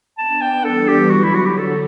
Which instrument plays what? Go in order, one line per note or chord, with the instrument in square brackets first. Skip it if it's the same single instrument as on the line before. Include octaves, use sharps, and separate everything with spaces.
[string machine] B3 D4 [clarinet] A5
[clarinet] G5
[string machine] E3 G3 [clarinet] A4
[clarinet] G4
[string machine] D3 F#3 [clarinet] F#4
[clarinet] E4
F#4
G4
A4